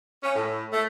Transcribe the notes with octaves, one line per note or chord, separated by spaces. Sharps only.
C#4
A2
A3